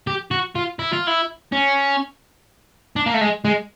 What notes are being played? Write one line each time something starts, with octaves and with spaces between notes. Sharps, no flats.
G4
F#4
F4
E4
F4
E4
C#4
D4
A#3
A3
G#3
G#3